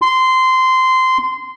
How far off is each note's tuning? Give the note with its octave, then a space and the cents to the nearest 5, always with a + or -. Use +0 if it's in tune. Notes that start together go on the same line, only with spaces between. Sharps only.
C6 -15